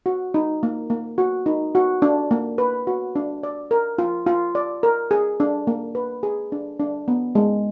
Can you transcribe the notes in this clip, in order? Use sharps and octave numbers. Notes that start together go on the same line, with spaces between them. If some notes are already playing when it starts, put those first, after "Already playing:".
F#4
D#4
A#3
A#3
F#4
D#4
F#4
D4
A#3
B4
F#4
D4
D5
A#4
F4
F4
D5
A#4
G#4
D4
A#3
B4
G#4
D4
D4
B3
G#3